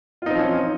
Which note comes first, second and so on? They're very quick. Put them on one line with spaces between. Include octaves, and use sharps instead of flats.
F4 D#4 C4 F3 C#4